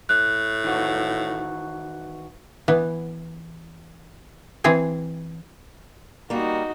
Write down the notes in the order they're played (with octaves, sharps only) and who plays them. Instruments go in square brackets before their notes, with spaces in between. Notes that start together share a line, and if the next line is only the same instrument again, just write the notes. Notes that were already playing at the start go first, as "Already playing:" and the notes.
[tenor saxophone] A2 [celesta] F#6
[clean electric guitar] D#3 E3 F#4
[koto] E3 B3
E3 C4 G#4 G#5
[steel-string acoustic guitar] G3 A#3 [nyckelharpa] D#4 F#4